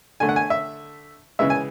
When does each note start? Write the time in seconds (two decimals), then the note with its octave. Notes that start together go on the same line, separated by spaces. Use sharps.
0.20 D3 A3 G#5
0.29 F#5
0.36 G#5
0.50 E5
1.39 C#3 E3 G#3 E5
1.50 G#5